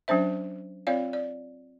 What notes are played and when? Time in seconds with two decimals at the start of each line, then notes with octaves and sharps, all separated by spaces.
0.08 F#3 C#4 D4 C5 E5
0.87 C4 F4 C#5 D5 F5
1.13 D5